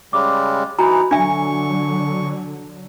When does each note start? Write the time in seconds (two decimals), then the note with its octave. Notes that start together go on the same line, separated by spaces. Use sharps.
0.13 C#3 G3 G#3 D6
0.79 E3 D#4 F#4 G#5 A#5 B5
1.11 D3 F#3 D4 E5 G#5 C#6